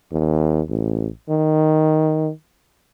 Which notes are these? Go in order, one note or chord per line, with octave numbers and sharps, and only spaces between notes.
D#2
A1
D#3